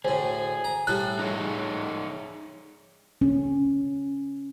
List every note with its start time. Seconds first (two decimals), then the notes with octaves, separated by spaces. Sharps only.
0.05 D2 A2 G#4 C5
0.64 A#5
0.87 A2 G3 A4 F#6
1.19 D#4 G#4 C#5
3.21 C#4